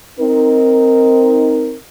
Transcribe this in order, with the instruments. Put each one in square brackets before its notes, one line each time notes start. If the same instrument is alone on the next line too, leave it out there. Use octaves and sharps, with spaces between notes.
[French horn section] C4 D#4 A#4